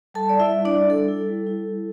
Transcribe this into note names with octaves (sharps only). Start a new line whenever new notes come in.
G3 A4 A5
E4 D5
E4 E5
G3
D4 D5
E4
G3 A4
E4
G3
E4
G3